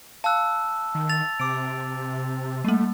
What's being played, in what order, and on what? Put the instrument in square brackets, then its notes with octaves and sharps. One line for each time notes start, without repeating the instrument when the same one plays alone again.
[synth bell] F5 F#6 [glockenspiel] A5 E6
[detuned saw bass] D#3
[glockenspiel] A6 F7
[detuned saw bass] C3 [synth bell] D6 D7
[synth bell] G3 A#3 [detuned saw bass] A3